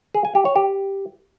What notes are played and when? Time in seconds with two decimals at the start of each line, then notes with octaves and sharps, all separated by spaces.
0.14 G#4
0.25 G#5
0.35 G4
0.45 C#5
0.56 G4